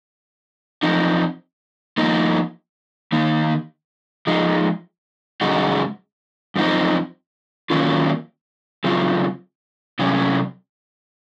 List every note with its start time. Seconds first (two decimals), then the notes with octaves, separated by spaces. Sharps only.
0.83 F3 C4 D#4
1.98 F3 A#3 D#4
3.12 D#3 A#3 D#4
4.27 F3 G#3 D#4
5.41 F#2 C#3 G#3 D#4 F#4
6.56 F#2 F3 C4 D#4
7.70 D#3 F#3 A#3 C#4 F4
8.84 C#3 F#3 C4 F4
9.99 C3 F#3 C#4